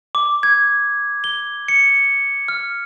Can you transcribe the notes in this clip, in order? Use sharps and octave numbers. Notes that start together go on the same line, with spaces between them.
D6
G#6
G7
C#7
F6